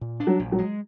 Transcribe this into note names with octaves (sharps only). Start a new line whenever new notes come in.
A#2
D4
F#3
A#1
F#3
G#3